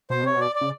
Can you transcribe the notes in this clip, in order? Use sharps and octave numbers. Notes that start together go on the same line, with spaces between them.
B2 C5
C3 C#5
B2 D5
D5
C#3